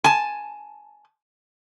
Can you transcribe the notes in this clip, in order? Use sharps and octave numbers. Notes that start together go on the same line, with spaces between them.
G#5 A5